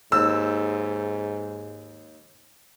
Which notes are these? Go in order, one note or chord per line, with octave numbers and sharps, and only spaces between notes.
D#2 G#2 E6